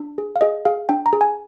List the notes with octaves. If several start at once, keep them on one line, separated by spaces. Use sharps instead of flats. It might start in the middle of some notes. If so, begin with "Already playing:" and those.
Already playing: D4
G#4
F5
G#4 D#5
G#4 F5
D4 G5
A#5
G#4
G#5